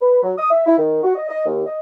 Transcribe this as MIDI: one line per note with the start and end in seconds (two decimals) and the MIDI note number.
0.01 0.22 71
0.23 0.32 54
0.38 0.48 87
0.50 0.63 76
0.66 0.75 64
0.78 1.03 51
1.03 1.13 66
1.15 1.26 75
1.28 1.44 75
1.46 1.64 39
1.66 1.79 75